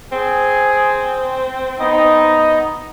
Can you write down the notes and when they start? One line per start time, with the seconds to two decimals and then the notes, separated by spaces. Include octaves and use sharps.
0.12 C4 G#4
1.80 B3 D#4 D#5